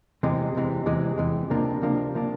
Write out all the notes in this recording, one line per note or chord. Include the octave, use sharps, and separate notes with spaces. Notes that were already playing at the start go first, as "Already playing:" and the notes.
E2 C3 E3 G#3
E2 C3 E3 G#3
E2 C3 E3 G#3
E2 C3 E3 G#3
C#2 C3 F3 A#3 D4
C#2 C3 F3 A#3 D4
C3 F3 A#3 D4